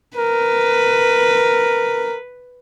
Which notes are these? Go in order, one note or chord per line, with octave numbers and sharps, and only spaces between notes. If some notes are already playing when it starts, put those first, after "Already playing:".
A#4 B4